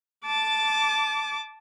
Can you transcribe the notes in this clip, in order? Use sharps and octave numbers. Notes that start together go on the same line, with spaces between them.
A5 D6